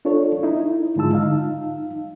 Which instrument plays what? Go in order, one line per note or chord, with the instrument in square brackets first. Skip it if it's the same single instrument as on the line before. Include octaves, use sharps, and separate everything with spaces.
[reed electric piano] D4 F4 A4 C#5
D#4 E4
G#2 D3 G#3 F4 A5 E6
D#4 F5